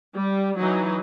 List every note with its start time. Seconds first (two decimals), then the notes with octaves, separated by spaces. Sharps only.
0.15 G3
0.57 E3 F#3 D#4